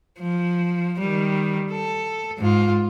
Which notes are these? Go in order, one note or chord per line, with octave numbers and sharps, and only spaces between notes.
F3
D#3 G3
A4
G#2 F4